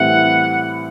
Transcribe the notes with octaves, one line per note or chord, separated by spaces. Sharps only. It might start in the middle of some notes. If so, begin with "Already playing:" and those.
Already playing: A2 E3 G3 C4 E4 F#5